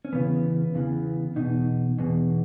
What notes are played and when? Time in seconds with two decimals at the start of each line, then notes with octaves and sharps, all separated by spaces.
0.05 C#4
0.13 E2 C#3 E3 B3
0.75 E2 C#3 E3
1.36 E2 B2 D#4
1.99 E2 B2